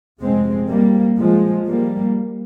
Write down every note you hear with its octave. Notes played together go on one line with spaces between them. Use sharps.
F1 F2 C3 G#3 C4
G3 A#3
F3 G#3
G3 A#3